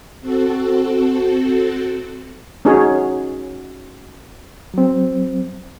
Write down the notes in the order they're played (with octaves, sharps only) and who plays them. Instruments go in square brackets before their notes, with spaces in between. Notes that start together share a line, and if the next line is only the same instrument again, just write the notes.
[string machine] C4 F#4 A4
[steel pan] C#4 D#4 F#4 G#4 C#5
[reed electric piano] F#3 C4